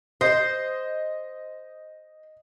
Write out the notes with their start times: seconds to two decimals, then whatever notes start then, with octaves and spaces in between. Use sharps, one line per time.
0.21 C5 D#5